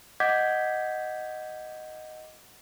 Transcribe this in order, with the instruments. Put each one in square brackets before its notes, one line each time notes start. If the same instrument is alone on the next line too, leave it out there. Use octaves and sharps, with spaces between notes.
[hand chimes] D#5 F#5 D6 G6 G#6 B6